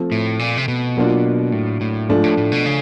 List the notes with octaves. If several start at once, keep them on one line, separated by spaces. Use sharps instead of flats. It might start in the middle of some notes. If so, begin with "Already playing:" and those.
Already playing: F3 A3 C4 F4
A2
A#2
C3
B2
F#3 A#3 D4 F4
A2
A2
G#2 F3 A3 D4 F4
A2
A2
B2
C#3